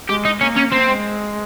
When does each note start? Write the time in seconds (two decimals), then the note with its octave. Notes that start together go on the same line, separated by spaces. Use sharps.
0.09 G#3 G4
0.25 D#4
0.40 A#3 C#4
0.57 C#4
0.72 A#3 C4
0.89 G#3